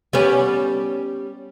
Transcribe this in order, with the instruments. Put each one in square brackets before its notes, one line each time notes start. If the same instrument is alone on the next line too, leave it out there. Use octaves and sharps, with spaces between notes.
[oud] G3 B3 C#4